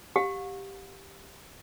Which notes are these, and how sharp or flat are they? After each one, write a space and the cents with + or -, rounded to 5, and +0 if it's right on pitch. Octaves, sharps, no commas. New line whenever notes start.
G4 +0 F5 +45